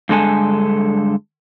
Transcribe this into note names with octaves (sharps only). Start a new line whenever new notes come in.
G2 D3 G#3 A4 G#5